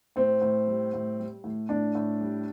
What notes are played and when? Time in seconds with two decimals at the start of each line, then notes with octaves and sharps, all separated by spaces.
0.16 A2 C4
0.41 A2
0.67 G3
0.93 A2
1.19 G3
1.44 A2
1.69 A2 D4
1.95 A2
2.20 G3